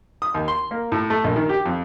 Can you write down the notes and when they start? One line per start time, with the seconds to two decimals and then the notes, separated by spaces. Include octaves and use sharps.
0.22 D#6
0.34 D#2
0.48 C6
0.71 A#3
0.92 A2
1.10 A3
1.24 A#1
1.36 D#3
1.49 G4
1.66 F2